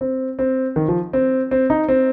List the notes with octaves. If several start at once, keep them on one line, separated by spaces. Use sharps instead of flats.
C4
C4
D#3
F3
C4
C4
D#4
C4